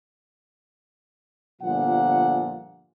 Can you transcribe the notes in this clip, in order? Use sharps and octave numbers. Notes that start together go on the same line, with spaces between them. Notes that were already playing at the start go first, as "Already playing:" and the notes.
G1 A#2 F3 F#5